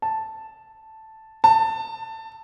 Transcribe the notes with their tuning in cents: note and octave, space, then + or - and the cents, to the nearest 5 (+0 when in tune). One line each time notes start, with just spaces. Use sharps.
A5 +0
A5 +20